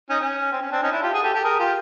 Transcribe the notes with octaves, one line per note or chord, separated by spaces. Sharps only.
C#4 D#4
C#4
C4
C#4
C4 D4
C#4 D#4
D4 E4
F4 G4
F#4 G#4
G4 A4
G4 A4
G#4 A#4
F4 G4